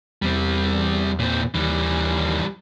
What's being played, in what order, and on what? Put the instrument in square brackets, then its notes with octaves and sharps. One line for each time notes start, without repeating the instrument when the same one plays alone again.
[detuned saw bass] E2 [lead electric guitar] G3 C4
[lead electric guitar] A#2 C4
[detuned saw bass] D#2 [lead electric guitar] E3 G3